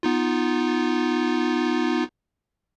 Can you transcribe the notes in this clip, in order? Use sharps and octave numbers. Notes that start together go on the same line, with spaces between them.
B3 D#4 F4